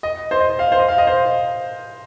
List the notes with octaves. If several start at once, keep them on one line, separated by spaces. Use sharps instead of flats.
D#5
C5
D#5
F5
C5
D#5
F5
D#5
C5